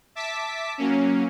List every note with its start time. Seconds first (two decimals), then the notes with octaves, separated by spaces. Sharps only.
0.15 E5 A5 D6 B6
0.78 F#3 A#3 C#4